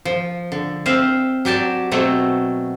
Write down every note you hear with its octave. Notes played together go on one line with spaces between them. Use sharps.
F3
D3
C4 E5 F5
F#3 G4 D5 A5
B2 F#3 A3 C4